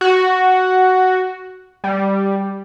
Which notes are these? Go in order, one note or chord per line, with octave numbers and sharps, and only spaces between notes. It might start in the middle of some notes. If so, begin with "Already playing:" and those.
F#4
G3